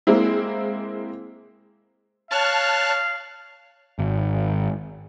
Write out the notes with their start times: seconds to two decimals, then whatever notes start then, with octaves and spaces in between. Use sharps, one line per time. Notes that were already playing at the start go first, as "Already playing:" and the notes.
0.07 G#3 A#3 C4 E4
2.31 C#5 F5 A5 F6 F#6
3.99 G#1